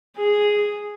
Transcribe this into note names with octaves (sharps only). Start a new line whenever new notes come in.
G#4